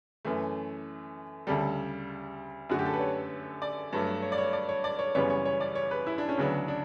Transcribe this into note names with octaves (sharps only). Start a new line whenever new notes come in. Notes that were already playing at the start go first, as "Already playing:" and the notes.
F#2 E3 A3
D2 C#3 G3 A4
F#2 D3 A3 F#4
G4
A4
B4
C#5
D5
G2 F#3 A3
C#5
D5
C#5
D5
C#5
D5
C#5
F#2 C#3 E3 G3 B3 C#5
C#5
C#5
D5
C#5
B4
E4
D4
C#4
D2 C#3 F#3 B3 D4
D4